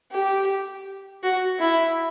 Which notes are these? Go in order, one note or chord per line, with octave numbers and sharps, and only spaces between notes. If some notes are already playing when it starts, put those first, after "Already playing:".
G4
F#4
E4